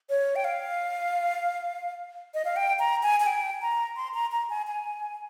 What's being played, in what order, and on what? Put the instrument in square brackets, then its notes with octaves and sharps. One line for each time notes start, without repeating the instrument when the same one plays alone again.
[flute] C#5
G5
F5
D#5
F5
G5
A#5
G#5
G#5
G5
A#5
C6
A#5
A#5
G#5
G#5